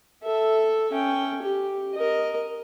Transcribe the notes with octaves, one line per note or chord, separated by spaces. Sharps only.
A4 E5
C#4 G5
G4
A#4 D#5